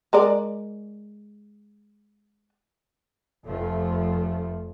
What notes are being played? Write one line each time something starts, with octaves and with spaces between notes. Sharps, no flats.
G#3 A#4 D5
F1 F2 F3 A3